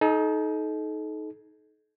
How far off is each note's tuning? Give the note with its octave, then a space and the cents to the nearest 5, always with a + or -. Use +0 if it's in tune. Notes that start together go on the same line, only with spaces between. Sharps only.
D#4 +10 A4 -35